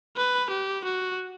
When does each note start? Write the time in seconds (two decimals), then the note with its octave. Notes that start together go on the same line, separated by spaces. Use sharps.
0.17 B4
0.50 G4
0.84 F#4